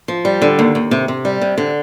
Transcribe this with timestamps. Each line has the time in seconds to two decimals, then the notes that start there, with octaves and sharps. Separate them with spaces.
0.08 F3
0.25 G3
0.42 D3
0.59 D#2
0.75 D#2
0.91 C3
1.08 C3
1.25 G3
1.41 C3
1.58 D3